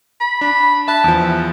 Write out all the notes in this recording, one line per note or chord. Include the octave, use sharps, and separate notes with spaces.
B5
D4
E5 A5 B5 F#6
E2 F3
E5